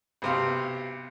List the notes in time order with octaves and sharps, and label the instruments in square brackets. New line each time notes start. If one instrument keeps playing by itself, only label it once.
[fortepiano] B1 C3 F5